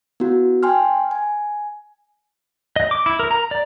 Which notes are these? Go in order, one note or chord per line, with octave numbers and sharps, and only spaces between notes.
B3 E4 F#4
G5 G#5 C6 F6
G#5
D#5
D6
E4
A#4
A#5
D5